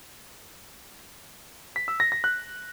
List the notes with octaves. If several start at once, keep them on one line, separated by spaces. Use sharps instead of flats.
B6
E6
A#6
A#6
F#6